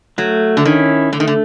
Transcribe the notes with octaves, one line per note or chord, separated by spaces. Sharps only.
F#3 A3
D3
D#3 C#4 E4
D3 A3
D#3
D3